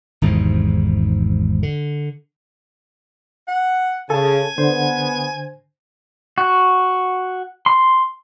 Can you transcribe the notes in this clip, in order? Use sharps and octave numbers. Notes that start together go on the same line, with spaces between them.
G#1 E2 G#2 C3
D3
F#5
C#3 A4 G#5 A5
D3 B3 C5
F#4
C6